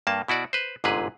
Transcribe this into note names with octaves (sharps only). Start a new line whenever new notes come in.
G2 A#3 A5
B2 E4 F#4 D5
B4 C5
G1 G#2 C3 G#4 B4